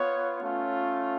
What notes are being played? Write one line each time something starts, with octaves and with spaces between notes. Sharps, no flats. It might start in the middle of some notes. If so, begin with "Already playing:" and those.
Already playing: B3 F4 C#5
A3 C#4 F4